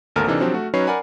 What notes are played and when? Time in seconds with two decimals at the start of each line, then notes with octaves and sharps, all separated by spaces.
0.16 G#1 D2 A#3 A4 A#4 F6
0.28 C3 E3 D4 D#4 A4
0.40 F3 F#3 C4 D4 G4
0.54 A3 F#4
0.74 F#3 C#4 D#4 B4 C#5 C7
0.87 A#4 D5 F#5 G#5 B5